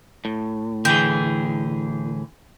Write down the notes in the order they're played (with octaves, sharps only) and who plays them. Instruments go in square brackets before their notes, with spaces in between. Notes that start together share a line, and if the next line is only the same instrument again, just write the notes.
[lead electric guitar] A2
[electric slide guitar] D3 E3 G#4 [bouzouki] G5